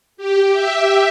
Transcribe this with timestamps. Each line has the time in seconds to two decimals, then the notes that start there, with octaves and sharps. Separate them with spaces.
0.17 G4
0.52 E5